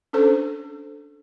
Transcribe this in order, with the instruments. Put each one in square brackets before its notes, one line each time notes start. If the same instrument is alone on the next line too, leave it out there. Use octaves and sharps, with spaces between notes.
[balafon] C#4 D4 A4 C5